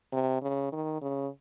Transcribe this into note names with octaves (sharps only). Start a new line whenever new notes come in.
C3
C#3
D#3
C#3